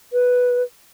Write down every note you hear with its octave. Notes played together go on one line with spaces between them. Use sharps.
B4